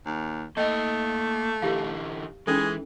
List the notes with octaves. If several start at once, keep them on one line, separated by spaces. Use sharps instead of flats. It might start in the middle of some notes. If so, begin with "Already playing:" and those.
D#2
A3 A#3 D#5 G5
D3 E3 E4 G4 F5
E3 G#3 C#4 D#4 A4